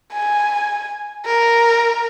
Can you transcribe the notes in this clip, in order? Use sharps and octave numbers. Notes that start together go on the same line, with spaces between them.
G#5
A#4